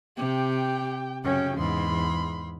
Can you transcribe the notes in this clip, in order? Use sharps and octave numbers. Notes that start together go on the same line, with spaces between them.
C3 G4 G5
F#2 C#3 C#4 G5
E2 G#2 B5 C6